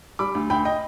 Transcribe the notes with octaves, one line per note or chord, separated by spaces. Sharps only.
G3 B5 D6
D2
D2 G5 B5
D#5 G5